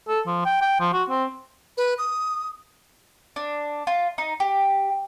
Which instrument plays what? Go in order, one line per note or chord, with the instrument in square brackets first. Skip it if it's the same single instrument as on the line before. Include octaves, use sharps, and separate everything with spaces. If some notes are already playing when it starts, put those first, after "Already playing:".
[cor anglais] A4
F3
G5
G5
F3
F#4
C4
[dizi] B4
D#6
[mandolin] D4
F4
D#4
G4